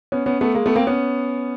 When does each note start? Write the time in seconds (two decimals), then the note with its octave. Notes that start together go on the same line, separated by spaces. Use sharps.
0.12 B3 C#4
0.26 B3 C#4
0.41 A3 B3
0.55 G#3 A#3
0.66 A3 B3
0.76 A#3 C4
0.87 B3 C#4